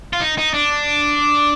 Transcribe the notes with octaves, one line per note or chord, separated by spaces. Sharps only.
F4
D#4
D#4
D4